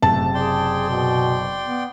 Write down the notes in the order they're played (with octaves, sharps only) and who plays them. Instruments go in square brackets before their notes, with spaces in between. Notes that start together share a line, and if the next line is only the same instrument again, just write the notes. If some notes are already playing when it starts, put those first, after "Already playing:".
[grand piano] F#1 C3 [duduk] A3 [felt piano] A5
[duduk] G#4 [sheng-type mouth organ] D5 G5 C6
[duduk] B2
B3